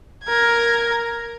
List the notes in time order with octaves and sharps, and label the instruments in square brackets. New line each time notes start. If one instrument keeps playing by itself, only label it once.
[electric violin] A#4 G#6